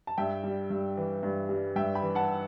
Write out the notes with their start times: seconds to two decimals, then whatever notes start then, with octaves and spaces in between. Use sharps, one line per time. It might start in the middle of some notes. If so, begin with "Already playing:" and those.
0.07 A5
0.18 G2 E5 G5
0.44 G3
0.70 G2
0.97 E3
1.23 G2
1.49 G3
1.76 G2 E5 G5
1.95 G5 B5
2.02 E3
2.15 F#5 A5